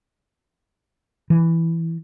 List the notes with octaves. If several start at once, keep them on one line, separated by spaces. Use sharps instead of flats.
E3